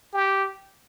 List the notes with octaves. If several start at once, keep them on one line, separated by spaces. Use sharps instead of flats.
G4